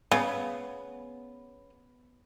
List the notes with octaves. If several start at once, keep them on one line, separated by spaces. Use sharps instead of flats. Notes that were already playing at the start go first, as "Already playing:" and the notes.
C#3 B3